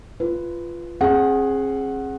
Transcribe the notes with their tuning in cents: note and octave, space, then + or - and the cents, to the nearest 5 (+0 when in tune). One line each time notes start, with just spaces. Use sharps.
F4 -15 B4 +0
C4 +45 G#4 +0 F#5 +0